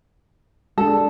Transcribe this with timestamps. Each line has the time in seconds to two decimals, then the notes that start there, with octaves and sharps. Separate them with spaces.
0.78 G#3 D4 A4